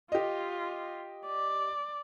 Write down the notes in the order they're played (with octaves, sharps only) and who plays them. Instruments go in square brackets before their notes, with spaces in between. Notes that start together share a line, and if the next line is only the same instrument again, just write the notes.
[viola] F4 [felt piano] G4 D#5
[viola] D5